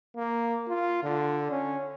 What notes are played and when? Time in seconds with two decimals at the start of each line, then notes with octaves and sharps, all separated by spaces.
0.16 A#3
0.68 F4
1.03 D3
1.51 C#4